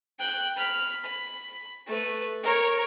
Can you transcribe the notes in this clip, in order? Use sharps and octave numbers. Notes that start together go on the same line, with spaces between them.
G5 F#6
B5 F6
B5
A3 B4
A#4 C#5